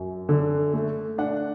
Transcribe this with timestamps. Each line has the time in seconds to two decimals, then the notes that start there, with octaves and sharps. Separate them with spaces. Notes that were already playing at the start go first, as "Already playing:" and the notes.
Already playing: F#2
0.29 D3
0.74 A3
1.18 D4 F#5